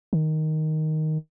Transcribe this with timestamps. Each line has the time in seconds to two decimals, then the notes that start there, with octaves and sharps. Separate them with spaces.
0.13 D#3